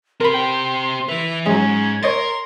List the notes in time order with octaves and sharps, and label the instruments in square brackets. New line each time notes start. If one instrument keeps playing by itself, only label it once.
[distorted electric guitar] C4 G4 [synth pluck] A#4 B5 [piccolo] C6
[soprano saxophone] G5
[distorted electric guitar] E3 B4 [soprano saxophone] E5 [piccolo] F7
[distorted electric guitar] G#2 [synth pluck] F#3 G#3 [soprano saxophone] C#4 [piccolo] G#6
[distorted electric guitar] A#4 [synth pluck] C#5 D#5 A6 [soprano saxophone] C6